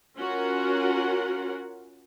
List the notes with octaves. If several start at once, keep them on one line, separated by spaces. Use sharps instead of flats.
C#4 F4 F#4 A#4 F#5